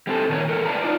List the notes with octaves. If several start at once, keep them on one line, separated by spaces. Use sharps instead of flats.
G3 C4 A4
A#2 D#3 A#4 C5 C#5
E2 A4 A#4
A#4 B4 D5 F5 A5 A#5
D#4 F4 D5